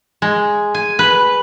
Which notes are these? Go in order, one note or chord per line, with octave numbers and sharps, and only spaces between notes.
G#3
G#5
B4